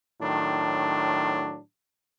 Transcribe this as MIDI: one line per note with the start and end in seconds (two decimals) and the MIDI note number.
0.21 1.60 45
0.21 1.60 51
0.21 1.60 54
0.21 1.60 62